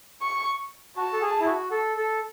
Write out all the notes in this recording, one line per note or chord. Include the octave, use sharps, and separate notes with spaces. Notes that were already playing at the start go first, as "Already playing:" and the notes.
C#6
F#4 A5
A4
G#4
E4
F#4
A4
A4